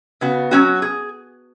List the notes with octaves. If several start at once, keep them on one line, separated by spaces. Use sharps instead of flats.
C#3 B3 F#4
F#3 C#4 F#4
G#4